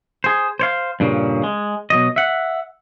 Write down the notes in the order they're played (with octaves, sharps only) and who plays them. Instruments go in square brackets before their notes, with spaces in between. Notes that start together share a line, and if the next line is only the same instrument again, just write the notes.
[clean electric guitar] G#4 C5
C5 C#5 F5
G2 A#2 C#3
G#3
B2 F#3 D#5
E5 F#5